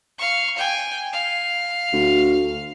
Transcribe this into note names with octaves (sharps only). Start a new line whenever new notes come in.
F5 C#6
G5 G#5
F5
D2